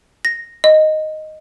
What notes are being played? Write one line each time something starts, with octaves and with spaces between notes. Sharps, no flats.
A#6
D#5